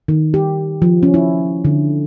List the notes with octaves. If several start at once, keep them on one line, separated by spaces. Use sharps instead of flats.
D#3
G4
F3
C#4
E4
D3